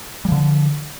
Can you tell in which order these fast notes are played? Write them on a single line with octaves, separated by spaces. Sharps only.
G3 F3 D3